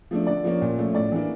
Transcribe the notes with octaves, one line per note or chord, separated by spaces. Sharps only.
F3 A3 D4
D3 D5
F3 A#3 C#4
A#2
F3 A3 C#4
A2 D5
E3 A#3 D4